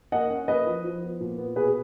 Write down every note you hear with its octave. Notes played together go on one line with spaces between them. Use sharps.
A#3 D#5 F#5
C#4
A#3 B4 D#5
F3
F3
B3
A#2
B3
B2 G#4 B4